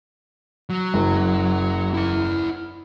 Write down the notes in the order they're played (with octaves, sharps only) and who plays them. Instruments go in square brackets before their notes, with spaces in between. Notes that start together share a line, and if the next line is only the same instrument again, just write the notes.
[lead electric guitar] F#3
[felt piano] F#1
[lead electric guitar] E4 F#5